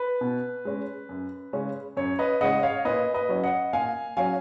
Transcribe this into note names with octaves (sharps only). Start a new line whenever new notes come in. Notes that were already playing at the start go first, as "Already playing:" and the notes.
Already playing: B4
B2
G#3 C#4
F#2
C#3 G#3 C#4
F#2 C#5
B4 D#5
C#3 G#3 C#4 D#5 F#5
C#5 F5
A#2 B4 D#5
B4 D#5
F#3 C#4
D#5 F#5
A#2 F5 G#5
F#3 C#4 F5 G#5